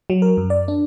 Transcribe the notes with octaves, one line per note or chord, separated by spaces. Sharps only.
F#3
A#4
F#2
D5
D4